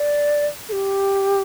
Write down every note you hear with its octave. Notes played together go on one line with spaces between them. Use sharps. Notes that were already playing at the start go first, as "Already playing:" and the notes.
Already playing: D5
A4
G4